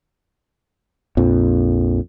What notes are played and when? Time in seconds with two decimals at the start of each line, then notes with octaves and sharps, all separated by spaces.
1.17 A#1 F2